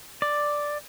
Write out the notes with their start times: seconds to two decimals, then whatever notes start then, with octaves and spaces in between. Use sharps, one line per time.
0.22 D5